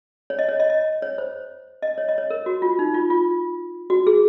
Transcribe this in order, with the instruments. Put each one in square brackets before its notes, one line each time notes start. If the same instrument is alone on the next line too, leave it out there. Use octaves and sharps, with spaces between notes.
[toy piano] C#5
D#5
C#5
D#5
D#5
C#5
C5
D#5
C#5
D#5
C#5
A#4
F#4
F4
D#4
F4
F4
F#4
G#4